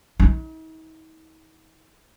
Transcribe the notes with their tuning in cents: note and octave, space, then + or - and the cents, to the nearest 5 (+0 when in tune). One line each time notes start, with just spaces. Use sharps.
D#4 +45